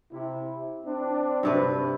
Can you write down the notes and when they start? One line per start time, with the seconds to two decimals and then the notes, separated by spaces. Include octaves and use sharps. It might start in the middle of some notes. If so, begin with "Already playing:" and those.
0.12 C3 E4
0.85 C4 D4
1.43 G2 C3 B4